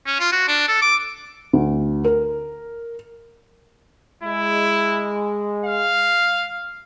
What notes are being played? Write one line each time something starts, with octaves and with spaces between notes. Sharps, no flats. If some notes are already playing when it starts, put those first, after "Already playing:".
C#4
F4
F#4
D4
A4
D6
D2
A#4
G#3 E4
F5